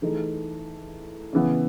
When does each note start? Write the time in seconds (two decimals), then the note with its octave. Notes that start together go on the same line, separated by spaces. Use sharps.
0.02 E3 A3 D#4 G#4
1.33 C#3 E3 B3